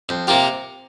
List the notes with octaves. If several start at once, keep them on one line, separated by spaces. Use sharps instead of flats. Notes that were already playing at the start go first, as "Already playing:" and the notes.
F2 C5
C3 A#3 F4 G4